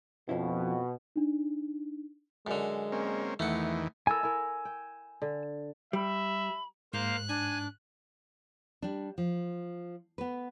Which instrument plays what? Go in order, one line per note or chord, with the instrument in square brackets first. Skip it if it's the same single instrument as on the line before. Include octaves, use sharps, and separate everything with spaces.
[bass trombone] F2 [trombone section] B2 [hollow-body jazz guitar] F3 C#4 E4
[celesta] D4 D#4
[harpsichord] F#2 D3 [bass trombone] G#3
[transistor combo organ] A#3 C4 C#4
[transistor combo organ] E2 D#3 E3 [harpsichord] A3 F#5
[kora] E4 A4 A#4 [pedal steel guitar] G#5 E6
[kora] E4 A#4
G5
D3
[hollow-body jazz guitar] G3 [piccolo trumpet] E5 [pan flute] B5
[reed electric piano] G#2 [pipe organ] A#3 C5 F5 [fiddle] F#6
[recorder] D4 [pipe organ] G#5
[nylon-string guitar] G3 D4
F3
B3 B4